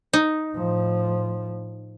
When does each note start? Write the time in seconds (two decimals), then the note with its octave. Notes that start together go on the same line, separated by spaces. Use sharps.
0.13 D#4
0.55 A2 F3